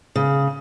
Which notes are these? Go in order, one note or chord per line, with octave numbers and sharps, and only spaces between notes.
C#3